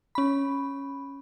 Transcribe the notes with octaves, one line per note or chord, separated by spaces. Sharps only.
C#4 B5